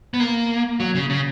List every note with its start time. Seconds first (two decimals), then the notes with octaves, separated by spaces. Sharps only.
0.14 B3
0.20 A#3
0.80 F#3
0.95 C#3
1.10 C#3